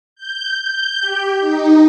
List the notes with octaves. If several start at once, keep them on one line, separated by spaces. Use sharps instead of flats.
G6
G6
G4
D#4